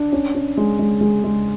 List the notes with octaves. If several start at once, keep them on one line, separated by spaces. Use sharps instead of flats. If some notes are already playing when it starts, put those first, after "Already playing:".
Already playing: D4
C#4
C#4
G#3
G#3
G#3
G#3